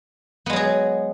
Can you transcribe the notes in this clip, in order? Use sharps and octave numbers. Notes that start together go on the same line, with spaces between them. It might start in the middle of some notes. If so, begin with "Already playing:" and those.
F#3 G#3 B3 G#4